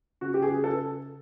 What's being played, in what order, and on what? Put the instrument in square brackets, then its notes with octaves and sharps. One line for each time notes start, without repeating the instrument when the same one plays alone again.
[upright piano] C#3 F#4
G4
G#4
C#3
A4